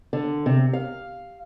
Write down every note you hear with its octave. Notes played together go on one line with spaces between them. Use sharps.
D3
C3
F5